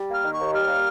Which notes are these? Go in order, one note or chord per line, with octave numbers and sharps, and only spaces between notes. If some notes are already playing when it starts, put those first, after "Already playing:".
Already playing: G3
A#3 F6
D#3
C#6
D#2
G3 F6
A#3